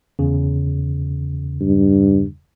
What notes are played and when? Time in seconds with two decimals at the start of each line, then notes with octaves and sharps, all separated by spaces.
0.19 E2 C#3
1.61 G2